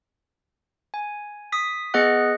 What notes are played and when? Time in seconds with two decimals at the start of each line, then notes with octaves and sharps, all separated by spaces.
0.94 G#5
1.52 D#6 B6
1.94 B3 G#4 D#5 F#5 F#6